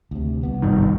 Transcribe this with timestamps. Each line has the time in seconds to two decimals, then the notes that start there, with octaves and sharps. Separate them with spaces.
0.11 D2 C3
0.43 C2 B3
0.62 G#1 G2 D#3